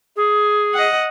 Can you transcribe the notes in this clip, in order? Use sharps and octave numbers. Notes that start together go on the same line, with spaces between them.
G#4
D#5 F#5